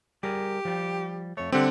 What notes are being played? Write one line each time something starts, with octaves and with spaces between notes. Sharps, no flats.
G3 G4 G#4 A#4
F3 G3
F2 A3 C#5
D3 G3 C4 G4 F#5